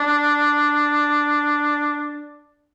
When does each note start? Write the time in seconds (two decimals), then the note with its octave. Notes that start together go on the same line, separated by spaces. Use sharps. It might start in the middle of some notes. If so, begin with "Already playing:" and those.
Already playing: D4